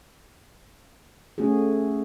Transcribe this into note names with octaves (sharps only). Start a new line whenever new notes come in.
A3 C#4 F#4 G#4